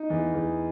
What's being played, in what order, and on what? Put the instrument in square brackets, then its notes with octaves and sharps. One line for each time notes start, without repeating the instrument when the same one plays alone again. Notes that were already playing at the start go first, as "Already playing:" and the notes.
Already playing: [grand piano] D#4
E2
E2